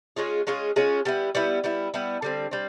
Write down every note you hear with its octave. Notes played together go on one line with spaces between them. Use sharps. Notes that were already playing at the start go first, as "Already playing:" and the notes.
G#3 C#4 F4 G#4
G#3 C#4 F4 G#4
G#3 C#4 F4 G#4
G3 B3 E4
G3 B3 E4
G3 B3 E4
G3 B3 E4
D3 G3 C4
G3 C4